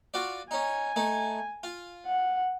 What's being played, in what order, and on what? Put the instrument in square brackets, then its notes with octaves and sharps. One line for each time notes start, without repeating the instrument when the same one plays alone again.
[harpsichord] F4 F#4 D5
[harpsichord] C#4 D#4 [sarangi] G#5
[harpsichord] A3 D#4
F4
[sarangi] F#5